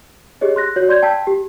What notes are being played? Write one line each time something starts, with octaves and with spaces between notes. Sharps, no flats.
G4 G#4 C#5 D#5
C6 F#6 A#6
F#4 C#5 G6
D5 C6 G6 G#6
G5 A5 E6 B6
G4